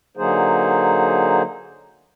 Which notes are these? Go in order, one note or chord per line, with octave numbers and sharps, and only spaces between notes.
D3 F#3 A#3 D#4 G#4 C5